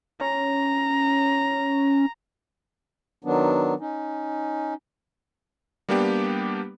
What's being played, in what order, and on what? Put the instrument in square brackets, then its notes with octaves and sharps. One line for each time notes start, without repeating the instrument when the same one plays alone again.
[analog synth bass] C#4 [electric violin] A#5
[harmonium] D#3 F#3 B3 D4
C#4 D#4
[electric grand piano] G3 A#3 B3 D4 G4